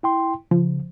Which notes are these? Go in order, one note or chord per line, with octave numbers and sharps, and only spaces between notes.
E4 G5 C6
C#3 F3